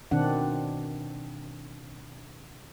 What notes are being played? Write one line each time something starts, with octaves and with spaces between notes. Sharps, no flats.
B2 D#3 C4 D4 F#5